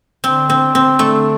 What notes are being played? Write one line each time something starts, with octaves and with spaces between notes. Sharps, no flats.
D3 C4 D4
C4
C4
A3